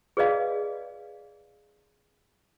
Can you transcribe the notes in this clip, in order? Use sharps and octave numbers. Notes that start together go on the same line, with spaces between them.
G#4 B4 D5 D#5 F5